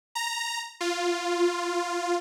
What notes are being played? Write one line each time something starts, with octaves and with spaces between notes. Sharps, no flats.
A#5
F4